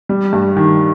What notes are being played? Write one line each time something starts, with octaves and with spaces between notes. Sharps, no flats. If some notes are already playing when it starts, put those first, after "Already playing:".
G3
G2
D#3